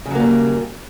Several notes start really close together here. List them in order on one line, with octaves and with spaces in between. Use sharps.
C#3 F#3 A#3 G3